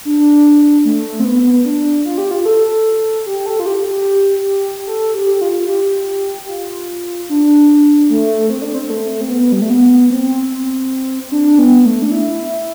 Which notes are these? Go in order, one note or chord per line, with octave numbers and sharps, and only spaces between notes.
D4
A3
C4
B3
D4
F4
G4
F4
A4
G4
A4
F4
G4
G4
A4
G4
F4
G4
F4
D4
A3
C4
D4
C4
A3
C4
B3
G3
A3
B3
C4
D4
B3
A3
D4
E4